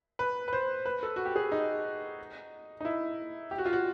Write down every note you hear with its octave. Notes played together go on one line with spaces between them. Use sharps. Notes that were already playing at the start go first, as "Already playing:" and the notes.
B4
B4
C5
B4
A4
F#4
G4
G#4
D#4
D#4
E4
G4
F#4
F4
F#4